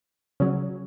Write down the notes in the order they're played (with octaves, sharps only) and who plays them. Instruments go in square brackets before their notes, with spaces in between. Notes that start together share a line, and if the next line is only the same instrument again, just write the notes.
[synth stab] C#3 F#3